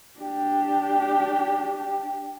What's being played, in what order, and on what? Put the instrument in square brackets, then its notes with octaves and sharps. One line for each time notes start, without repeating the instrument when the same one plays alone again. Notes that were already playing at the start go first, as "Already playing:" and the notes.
[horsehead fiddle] D4 G4